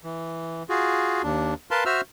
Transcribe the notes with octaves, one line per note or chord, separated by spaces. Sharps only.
E3
F4 F#4 G#4
D#2 D4
A#4 B4 F5 A5 C6
F#4 C5 E5 E6 F6